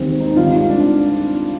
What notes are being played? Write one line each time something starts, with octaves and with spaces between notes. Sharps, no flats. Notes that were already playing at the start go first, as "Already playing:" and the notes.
Already playing: D#2 D#3 G#3 C4
D#4
G#1 G#2 D#3 G3 F4
D4